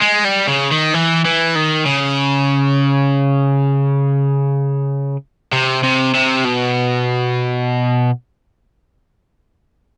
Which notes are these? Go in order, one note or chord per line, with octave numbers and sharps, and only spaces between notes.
G#3
G3
C#3
D#3
E3
E3
D#3
C#3
C3
C3
C3
B2